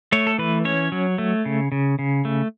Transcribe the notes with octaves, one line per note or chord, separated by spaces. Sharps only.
A3 C#5
A4
E3 B4
C#4 C#5
F#3
A3
C#3
C#3
C#3
A3